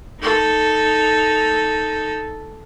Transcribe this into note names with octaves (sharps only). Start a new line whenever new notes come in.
D#4 A4